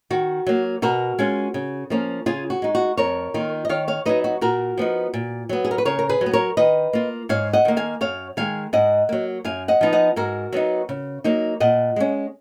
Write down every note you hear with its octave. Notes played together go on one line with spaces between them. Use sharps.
D#3 F#4
F#3 A#3
B2 F#4 A#4
G#3 C#4 F4
C#3
F3 A#3 C#4
C#3 F4 G#4
F#4
G#3 D#4
F#4
F2 A#4 C#5
D#3 A#3 F4
D#5
D#3 C#5 F5
C#5 F5
F#3 B3 D#4 B4 D#5
F#4
A#2 F#4 A#4
F3 B3 D#4
A#2
F#3 B3
G#4
A#4
B4
C#3 A#4 C#5
A#4
G#4 B4
F#3
B3
A#4 C#5
D#3 B4 D#5
A#3 F4
G#2 C#5 F5
D#5 F#5
D#3 A#3
F5 G#5
F#2 C#5 F5
D#3 G#3 F5 G#5
G#2 D#5 F#5
F#3 A#3
F#2 F5 G#5
D#5 F#5
F3 B3 D#4
D#5 F#5
G#2 F#4 A#4
F#3 B3 D#4
C#3
F#3 A#3 D#4
A#2 D#5 F#5
G#3 C#4